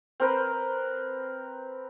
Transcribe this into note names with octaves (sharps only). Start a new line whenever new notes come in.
C4 A#4 B4